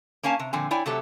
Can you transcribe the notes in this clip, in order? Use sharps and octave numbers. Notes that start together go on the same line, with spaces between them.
A#3 C#4 F5 G#5 A5
C3
A#2 D3 F3 C4 G#5
E4 C#5 D5 G5 G#5
C3 F#3 A3 G4 A4